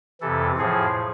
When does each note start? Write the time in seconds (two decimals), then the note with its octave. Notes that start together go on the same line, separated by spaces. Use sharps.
0.21 F2 C3 E3 A4
0.58 A2 F3 G#4